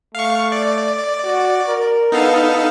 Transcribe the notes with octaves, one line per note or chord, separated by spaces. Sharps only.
A3 F5 C#6
D5
F#4
A#4
B3 D#4 A4 F5